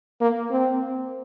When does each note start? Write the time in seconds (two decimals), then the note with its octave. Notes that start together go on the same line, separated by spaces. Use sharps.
0.21 A#3
0.51 C4